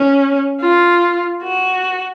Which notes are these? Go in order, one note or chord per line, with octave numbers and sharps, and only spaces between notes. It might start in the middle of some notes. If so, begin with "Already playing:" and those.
Already playing: C#4
F4
F#4